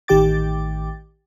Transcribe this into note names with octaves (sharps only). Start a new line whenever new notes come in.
A1 D#3 G4 G5 D6 A6